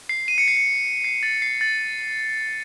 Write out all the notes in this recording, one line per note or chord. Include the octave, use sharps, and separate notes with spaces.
C7
D#7
C#7
C7
C#7
C7
A6
C7
A6